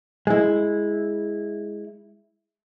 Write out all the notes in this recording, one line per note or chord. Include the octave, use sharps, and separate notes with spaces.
G#3 E4